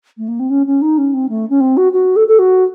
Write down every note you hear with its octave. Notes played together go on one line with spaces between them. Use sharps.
A3
A#3
C4
C#4
C#4
D#4
C#4
C4
A3
C#4
C4
F#4
F#4
A4
A4
F#4